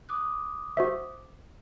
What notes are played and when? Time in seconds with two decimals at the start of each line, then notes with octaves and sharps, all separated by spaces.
0.09 D6 D#6 F#6
0.77 F#4 C5 E5